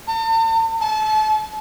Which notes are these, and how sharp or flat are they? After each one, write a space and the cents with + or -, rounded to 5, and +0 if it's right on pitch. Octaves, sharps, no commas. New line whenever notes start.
A5 +45
A5 -30